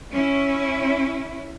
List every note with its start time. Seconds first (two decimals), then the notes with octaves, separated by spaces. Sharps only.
0.12 C#4 E4